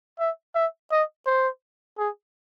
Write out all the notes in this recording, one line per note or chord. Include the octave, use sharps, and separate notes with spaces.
E5
E5
D#5
C5
G#4